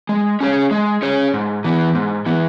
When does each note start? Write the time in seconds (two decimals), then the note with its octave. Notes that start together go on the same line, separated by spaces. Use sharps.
0.09 G#3
0.40 C#4 G#4 C#5
0.71 G#3
1.02 C#4 G#4 C#5
1.34 G#2
1.64 E3 B3
1.95 G#2
2.26 E3 B3